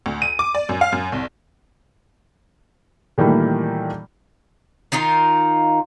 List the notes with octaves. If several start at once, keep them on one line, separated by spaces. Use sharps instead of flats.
D2
D#7
D6
D5
F#2
F5
F#2
C2
A#2 D#3 E3 G3 A3 A#3
D#3 D#4 F4 A#4